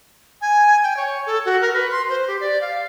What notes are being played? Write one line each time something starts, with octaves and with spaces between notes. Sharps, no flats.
G#5
G5
C#5
A4
F#4
A#4
B4
C6
C5
G4
D5
F5